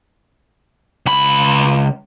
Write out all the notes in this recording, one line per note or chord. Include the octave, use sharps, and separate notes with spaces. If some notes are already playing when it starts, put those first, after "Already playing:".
C#2 B5